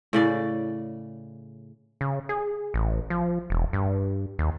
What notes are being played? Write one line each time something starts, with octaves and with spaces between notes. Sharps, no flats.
A2 C#3 D5
C#3
G#4
A1
F3
E1
G2
D#2